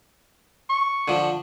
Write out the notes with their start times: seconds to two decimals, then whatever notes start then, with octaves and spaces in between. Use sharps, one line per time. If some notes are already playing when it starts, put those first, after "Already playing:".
0.70 C#6
1.08 D3 F3